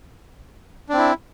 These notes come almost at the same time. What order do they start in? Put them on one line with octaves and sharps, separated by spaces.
D4 C4 E4